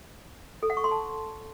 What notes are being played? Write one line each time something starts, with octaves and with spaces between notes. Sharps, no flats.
A4
F#5
C#6
C6
A5